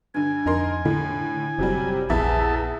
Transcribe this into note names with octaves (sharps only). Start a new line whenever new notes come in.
G2 D3 G#5
F2 D#4 A#4 C6
A2 D3
F#1 C3 F#3 G3
A#1 E2 G#4 E5 A5